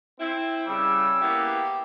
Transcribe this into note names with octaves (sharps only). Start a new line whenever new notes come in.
C4 E4
C#3 G3 E6
A#3 B3 E4 G4